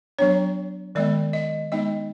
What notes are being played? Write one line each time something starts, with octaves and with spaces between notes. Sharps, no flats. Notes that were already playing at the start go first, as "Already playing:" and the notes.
F#3 B3 D4 C#5
D#3 G#3 B3 D5
D#5
G#3 B3 D#4 D#5